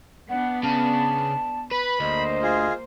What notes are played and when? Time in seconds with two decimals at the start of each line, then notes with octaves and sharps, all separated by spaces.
0.29 B3 D4 F#5
0.63 C#3 A5
1.71 B4 B5
2.00 D2 A#3 C5 D#5
2.43 F4 G#4